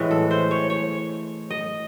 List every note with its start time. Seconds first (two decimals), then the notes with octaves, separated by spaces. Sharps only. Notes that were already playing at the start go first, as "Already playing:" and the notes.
Already playing: A2 E3 G#3
0.11 A4
0.31 C5
0.51 C#5
0.70 C#5
1.50 D#5